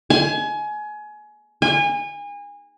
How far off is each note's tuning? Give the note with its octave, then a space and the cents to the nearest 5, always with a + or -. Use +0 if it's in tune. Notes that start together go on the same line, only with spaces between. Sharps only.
G#5 +25
G#5 -30